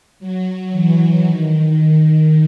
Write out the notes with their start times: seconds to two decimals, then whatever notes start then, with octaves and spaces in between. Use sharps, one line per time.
0.19 F#3
0.72 E3
1.23 D#3